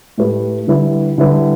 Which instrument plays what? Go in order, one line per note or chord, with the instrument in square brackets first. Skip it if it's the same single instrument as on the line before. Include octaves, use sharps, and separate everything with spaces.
[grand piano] A2 A3 G4 B4
D3 G3 E4 B4
D3 G3 E4 B4